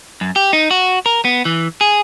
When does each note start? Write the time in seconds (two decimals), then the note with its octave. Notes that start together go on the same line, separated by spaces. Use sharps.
0.21 F#2
0.36 G4
0.53 D#4
0.71 F#4
1.06 A#4
1.25 B3
1.45 E3
1.81 G#4